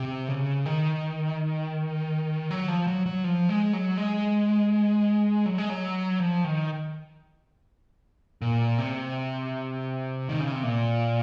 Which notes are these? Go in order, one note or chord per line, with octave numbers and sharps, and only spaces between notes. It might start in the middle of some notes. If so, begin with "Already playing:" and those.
Already playing: C3
C#3
D#3
F#3
F3
F#3
F#3
F3
G#3
F#3
G#3
F#3
G#3
F#3
F3
D#3
A#2
C3
D#3
C#3
C3
A#2